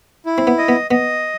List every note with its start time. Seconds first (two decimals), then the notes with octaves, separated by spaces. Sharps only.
0.26 E4
0.38 C4
0.47 B3
0.58 D#5
0.68 B3
0.91 B3 D#5